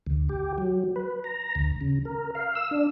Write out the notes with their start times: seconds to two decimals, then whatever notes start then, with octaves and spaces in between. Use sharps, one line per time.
0.06 D2
0.29 G4
0.58 F#3
0.96 B4
1.24 A#5
1.55 D2
1.81 C#3
2.05 A#4
2.35 F5
2.55 E6
2.71 D4